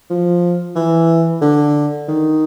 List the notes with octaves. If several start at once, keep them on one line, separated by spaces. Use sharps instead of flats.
F3
E3
D3
D#3